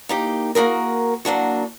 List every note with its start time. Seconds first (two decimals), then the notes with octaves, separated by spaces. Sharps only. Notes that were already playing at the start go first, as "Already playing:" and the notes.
0.09 A#3 D#4 G4
0.55 A#3 F#4 G#4 A#4
1.25 F#3 A#3 D4 F#4